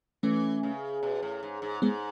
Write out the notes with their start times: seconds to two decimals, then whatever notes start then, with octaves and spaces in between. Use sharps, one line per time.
0.23 E3 A3 C#4
0.63 C#3
1.03 B2
1.22 A2
1.43 G#2
1.62 G#2
1.82 G#2 G#3 B3